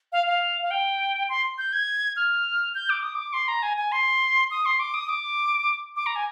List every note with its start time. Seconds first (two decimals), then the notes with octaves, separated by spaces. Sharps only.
0.12 F5
0.27 F5
0.62 F5
0.71 G5
1.29 C6
1.58 G6
1.73 G#6
2.16 F6
2.75 G6
2.89 D6
3.02 D#6
3.15 D6
3.33 C6
3.48 A#5
3.63 G#5
3.77 G#5
3.92 C6
4.51 D#6
4.65 C6
4.80 D6
4.94 D#6
5.09 D6
5.96 D6
6.06 A#5
6.16 G#5